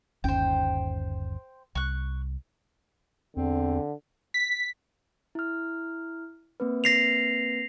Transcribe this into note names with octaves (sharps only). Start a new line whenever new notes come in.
G1 D#2 C#4 C5 G5
C2 C#6 F#6
E2 D3 C4
B6
E4 F6
A#3 C4 B4
A#6 C7 F7